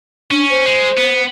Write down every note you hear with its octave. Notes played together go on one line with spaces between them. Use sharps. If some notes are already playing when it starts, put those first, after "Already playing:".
C#4 D4
C5
G#3
B3